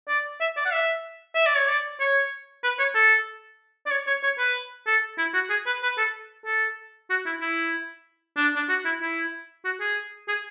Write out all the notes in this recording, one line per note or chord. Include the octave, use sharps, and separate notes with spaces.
D5
E5
D5
F#5
E5
E5
D5
C#5
D5
C#5
B4
C#5
A4
D5
C#5
C#5
C#5
B4
A4
E4
F#4
G#4
B4
B4
A4
A4
F#4
E4
E4
D4
D4
F#4
E4
E4
F#4
G#4
G#4